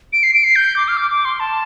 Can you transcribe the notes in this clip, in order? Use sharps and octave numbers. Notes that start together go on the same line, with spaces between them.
D7
C7
D7
C7
G6
D6
F6
D6
D6
C6
A5